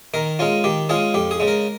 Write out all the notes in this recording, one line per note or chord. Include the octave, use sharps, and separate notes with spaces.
D#3 A#4
G#3 C#4 F4
D#3 G4
G#3 C#4 F4 G#4
F2 G4
G#4
C#3 G#3
A#4